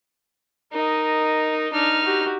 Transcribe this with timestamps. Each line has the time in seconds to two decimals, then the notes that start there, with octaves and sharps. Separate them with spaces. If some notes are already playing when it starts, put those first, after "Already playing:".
0.73 D#4 A#4 D#5
1.73 D4 D#4 F6
2.04 F#4 G4